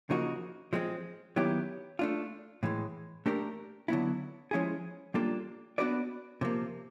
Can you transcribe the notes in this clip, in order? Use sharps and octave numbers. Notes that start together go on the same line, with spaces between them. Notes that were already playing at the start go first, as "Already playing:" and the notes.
C#3 F3 A#3 D#4 F#4
F3 G#3 C4
D#3 F#3 B3 E4 G4
A3 D4 F4
A2 E3 G#3
A3 D4 G4 A#4
D3 F#3 B3 E4
F3 G#3 C#4 E4 G#4
G3 A#3 D4 F4 A4
B3 D4 F#4 B4 D5
C3 F3 A#3